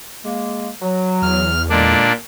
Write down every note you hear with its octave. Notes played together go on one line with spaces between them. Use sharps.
G#3 A#3
F#3
E2 F6
A#2 D3 G#3 D4